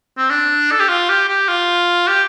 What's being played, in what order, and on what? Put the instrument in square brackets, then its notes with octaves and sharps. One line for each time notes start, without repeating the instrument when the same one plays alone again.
[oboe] C4
D4
A4
G4
F4
G4
G4
F4
G4